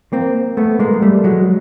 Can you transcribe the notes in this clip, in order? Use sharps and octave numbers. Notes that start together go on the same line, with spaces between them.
A#3 C4
A3 B3
G#3 A#3
G#3
G3 A3
F#3 G#3